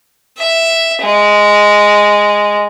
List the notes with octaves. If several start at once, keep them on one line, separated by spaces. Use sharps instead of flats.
E5
G#3